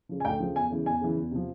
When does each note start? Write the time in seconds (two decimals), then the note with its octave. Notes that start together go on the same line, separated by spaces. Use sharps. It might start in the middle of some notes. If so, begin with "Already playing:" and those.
0.09 C#3 F3
0.20 G#5
0.25 D2 G5
0.40 C#3 F3
0.55 E2 G#5
0.71 C#3 E3
0.86 E2 G#5
1.01 C#3 E3
1.16 E2
1.31 C3 F3